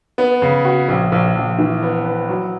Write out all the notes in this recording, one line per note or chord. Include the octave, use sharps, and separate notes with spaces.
B3
C#3
F#4
A#1
A#1
A#1
E3
B3
B3
F#3